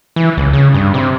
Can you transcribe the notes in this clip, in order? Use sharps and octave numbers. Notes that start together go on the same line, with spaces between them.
E3
C#2
C#3
G2
C3